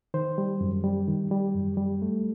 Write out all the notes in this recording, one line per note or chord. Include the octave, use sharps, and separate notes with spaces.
D#3 C5
G3
F#2
G3
D#3
G3
F#2
G3
A3